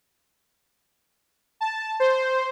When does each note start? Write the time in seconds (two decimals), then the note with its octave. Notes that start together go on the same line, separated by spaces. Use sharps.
1.61 A5
2.00 C5